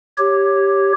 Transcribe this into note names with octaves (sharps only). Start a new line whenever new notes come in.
G4 C#5